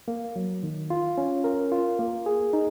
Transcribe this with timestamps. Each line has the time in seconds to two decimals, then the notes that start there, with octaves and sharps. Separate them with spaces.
0.08 A#3
0.36 F#3
0.63 D#3
0.90 F4
1.18 C#4
1.44 A#4
1.72 F4
1.99 A#3
2.26 G#4
2.53 D#4